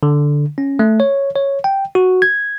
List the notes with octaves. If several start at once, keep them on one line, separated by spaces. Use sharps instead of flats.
D3
C#4
A3
C#5
C#5
G5
F#4
G#6